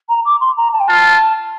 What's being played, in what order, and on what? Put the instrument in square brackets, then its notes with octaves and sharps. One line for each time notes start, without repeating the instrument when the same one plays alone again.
[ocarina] A#5
D6
C6
A#5
A5
G5
[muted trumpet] F4 [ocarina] A5